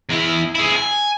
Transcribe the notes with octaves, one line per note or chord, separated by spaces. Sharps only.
E2 E4
E4 G#4
G#5